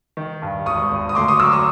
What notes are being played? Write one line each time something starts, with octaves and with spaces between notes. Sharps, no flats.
D#3
G2
G#1 C#6 D#6
G#1
D#6
D2 C6 D6
C#6 D#6
F#3 D6 E6
C#6 D#6